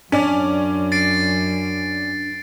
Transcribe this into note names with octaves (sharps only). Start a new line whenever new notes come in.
F#2 C#4 D4 D5
A6 C7 D7